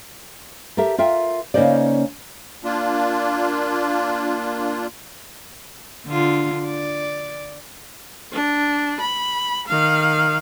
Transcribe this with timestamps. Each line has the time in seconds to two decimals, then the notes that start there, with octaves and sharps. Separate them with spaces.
0.77 G4 A4 A#4 E5
0.98 F4 A#4 E5 G5
1.54 C#3 A#3 C#4 D#4 C5 D5
2.64 A#3 D4 F4
6.07 D3 F4
6.67 D5
8.33 D4
9.00 B5
9.67 D#3 F5